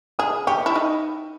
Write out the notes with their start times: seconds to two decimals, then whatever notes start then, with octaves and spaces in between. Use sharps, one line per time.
0.19 G#4 D#6
0.47 G4 C#6
0.66 E4
0.75 D#4